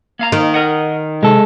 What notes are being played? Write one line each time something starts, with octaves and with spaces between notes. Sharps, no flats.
A#3 F5 A#5
D#3
A#4 D#5 F#5
C3 G#3 A4